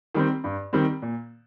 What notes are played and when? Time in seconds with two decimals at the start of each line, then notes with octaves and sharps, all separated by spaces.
0.14 D#3 G3 C4
0.44 G2
0.73 D#3 G3 C4
1.02 A#2